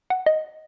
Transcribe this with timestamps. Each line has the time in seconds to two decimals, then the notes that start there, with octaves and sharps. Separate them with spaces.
0.10 F#5
0.26 D#5